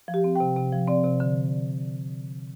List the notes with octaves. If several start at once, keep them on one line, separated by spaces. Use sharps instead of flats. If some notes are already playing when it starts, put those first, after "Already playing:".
F3
G4
C4
C3 G5
C3
F3
C4 D5
C3
D3